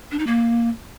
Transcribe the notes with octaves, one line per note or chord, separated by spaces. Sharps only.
D4
D#4
A#3